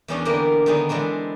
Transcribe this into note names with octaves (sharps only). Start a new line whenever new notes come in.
E2 G3 B3 C#4 D4 C#5
D3 E3 A#3 B3 G4 A#4
D3 D#3 F#3 B3 D#4 G#4
E3 G#3 B3 C4 D4